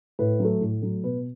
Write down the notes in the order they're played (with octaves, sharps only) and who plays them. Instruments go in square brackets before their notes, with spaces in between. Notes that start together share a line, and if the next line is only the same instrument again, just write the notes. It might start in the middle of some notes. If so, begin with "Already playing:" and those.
[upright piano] A2 B4
F#3 A3
A2
F#3 A3
B2 B4